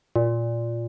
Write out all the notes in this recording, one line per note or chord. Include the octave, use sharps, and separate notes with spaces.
A#2